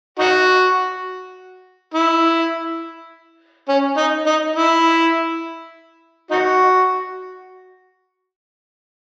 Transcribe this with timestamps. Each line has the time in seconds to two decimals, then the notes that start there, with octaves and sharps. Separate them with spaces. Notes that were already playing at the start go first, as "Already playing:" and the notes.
0.19 D#4 F#4
1.94 E4
3.69 C#4
3.97 D#4
4.27 D#4
4.56 E4
6.31 D#4 F#4